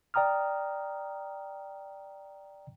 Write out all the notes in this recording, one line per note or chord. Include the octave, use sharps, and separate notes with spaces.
D5 G5 A#5 D#6 F6